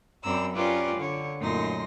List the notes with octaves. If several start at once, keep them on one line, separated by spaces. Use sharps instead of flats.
F#2 C4 D5 A#5 B5 E6
C#4 F4 G4 A#4 B4 D5
D3 C#5
F#2 A#2 A3 D#4 C6 A#6